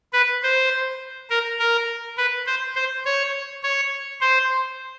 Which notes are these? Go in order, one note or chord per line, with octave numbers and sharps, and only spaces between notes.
B4
C5
A#4
A#4
B4
C5
C5
C#5
C#5
C5